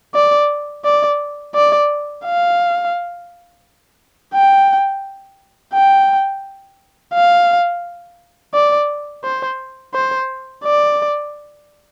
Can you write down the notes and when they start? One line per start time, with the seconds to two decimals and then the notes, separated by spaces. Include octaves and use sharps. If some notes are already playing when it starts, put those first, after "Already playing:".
0.15 D5
0.85 D5
1.55 D5
2.25 F5
4.34 G5
5.74 G5
7.14 F5
8.54 D5
9.24 C5
9.94 C5
10.64 D5